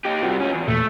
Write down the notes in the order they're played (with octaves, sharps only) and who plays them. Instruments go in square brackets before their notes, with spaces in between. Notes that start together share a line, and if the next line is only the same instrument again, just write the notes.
[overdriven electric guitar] D#4 G4
[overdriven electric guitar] C3 G3 [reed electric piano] F4 F#4
[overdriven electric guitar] C#2 C#4
E2
[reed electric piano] E2 A#2 [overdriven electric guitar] A3